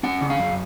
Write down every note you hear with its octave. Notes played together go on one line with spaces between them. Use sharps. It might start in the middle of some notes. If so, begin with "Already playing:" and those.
C#4 F#5
C#3
F5
F#2